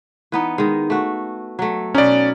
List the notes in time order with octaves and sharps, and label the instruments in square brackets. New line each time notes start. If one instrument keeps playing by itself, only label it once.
[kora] E3 B3 D#4
D#3 G#3
A3 F#4
F#3 A3
[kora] B2 D#4 [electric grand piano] C#4 D5